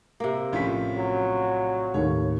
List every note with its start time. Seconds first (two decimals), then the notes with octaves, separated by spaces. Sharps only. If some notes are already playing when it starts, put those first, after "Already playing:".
0.20 C3 A#3
0.52 A#1 A2 C#4 F4 B6
0.97 F#3
1.94 D#2 A2 A3 C#5